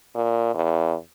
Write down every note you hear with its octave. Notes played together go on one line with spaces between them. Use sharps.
A#2
E2